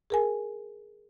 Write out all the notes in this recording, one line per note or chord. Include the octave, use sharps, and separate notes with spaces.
G#4 A#4 G#5